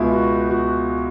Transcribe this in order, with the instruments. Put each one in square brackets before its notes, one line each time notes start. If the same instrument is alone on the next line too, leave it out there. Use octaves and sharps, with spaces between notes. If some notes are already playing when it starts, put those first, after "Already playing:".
Already playing: [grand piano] C#2 B2 B3 E4 G#4
F#4
F#4